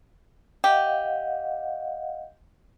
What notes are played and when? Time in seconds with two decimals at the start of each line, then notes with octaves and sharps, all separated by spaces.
0.64 G4 D#5 F5 F#5